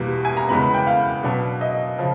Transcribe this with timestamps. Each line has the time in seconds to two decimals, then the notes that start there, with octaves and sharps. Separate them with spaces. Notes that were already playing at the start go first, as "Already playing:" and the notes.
Already playing: E2 B2 G3 A#3
0.25 G#5
0.37 A#5
0.49 E2 C#3 E3 G#3 B3 B5
0.62 B5
0.74 G5
0.87 F5
1.23 B2 F#3 B3 D4
1.61 D#5
1.98 C#3 F3